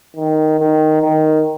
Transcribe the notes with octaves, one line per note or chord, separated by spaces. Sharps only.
D#3
D#3
D#3